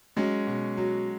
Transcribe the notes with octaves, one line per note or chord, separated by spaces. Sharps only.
F#3 G#3 C#4
B2
F#3